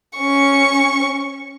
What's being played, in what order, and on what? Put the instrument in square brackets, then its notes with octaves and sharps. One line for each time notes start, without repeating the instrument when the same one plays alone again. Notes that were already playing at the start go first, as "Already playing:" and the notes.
[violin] C#4 C#6